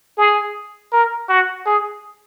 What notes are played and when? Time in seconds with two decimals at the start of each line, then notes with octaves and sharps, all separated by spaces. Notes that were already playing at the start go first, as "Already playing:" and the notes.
0.18 G#4
0.92 A#4
1.29 F#4
1.66 G#4